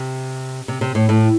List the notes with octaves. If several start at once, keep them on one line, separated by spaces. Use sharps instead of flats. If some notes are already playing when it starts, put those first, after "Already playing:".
Already playing: C3
C3
C3
A2
A2